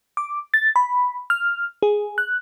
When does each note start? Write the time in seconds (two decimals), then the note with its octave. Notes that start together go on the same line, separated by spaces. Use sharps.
0.17 D6
0.54 A6
0.76 B5
1.30 F6
1.83 G#4
2.18 F#6